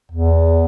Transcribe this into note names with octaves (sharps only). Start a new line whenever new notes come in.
E2